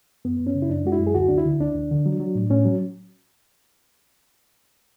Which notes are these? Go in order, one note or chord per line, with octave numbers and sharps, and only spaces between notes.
F#2 B3
F#2
C#4
C#3
E4
F#2 D4
G#3 F#4
E4
F#2
G#4
D2 F#4
D2 D4
E4
D3
D2 D4
D2
D3
F#3
F#3
A2
A2 C#4
F#3